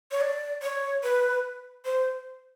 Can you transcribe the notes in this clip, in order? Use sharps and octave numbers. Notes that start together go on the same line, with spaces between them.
C#5
D5
C#5
B4
C5